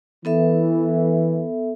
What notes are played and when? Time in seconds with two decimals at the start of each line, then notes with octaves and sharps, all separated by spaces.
0.25 E3 B3 A4 E5